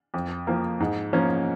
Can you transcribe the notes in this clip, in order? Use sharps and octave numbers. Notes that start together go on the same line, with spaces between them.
F2
F3 A#3
G#2
F3 A#3 C#4